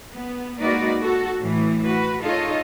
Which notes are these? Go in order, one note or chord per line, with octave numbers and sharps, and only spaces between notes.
B3
G#3 A#3 D#4 F#4 B4 D5
F#4 A4
A2 E3
F#4 B4
D#4 F4 G#4 A4 C#5 D#5